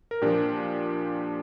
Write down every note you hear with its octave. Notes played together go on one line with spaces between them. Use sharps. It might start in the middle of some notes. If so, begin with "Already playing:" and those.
A#4
A#2 F3 D4 G4